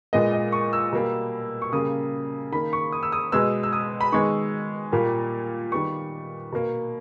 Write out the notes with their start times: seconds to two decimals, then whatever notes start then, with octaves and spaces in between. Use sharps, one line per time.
0.13 A#2 G#3 B3 D#5
0.33 D#5
0.52 C#6
0.73 E6
0.92 B2 G3 A#3
1.62 C#6
1.72 C#3 G3 A#3 D#6
2.52 D#3 A#3 B5
2.73 C#6
2.92 D#6
3.03 E6
3.12 D#6
3.32 B2 G#3 B3 E6
3.63 E6
3.73 D#6
4.01 B5
4.12 D#3 G#3 B3 C#6
4.92 A#2 G3 A#3
5.72 D#3 G3 B3 C#6
6.52 B2 A#3